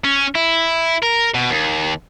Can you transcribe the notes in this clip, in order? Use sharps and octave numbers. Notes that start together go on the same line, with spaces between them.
C#4
E4
A#4
B2
D#2